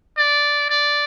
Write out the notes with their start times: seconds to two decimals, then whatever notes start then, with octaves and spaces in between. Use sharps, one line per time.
0.17 D5
0.70 D5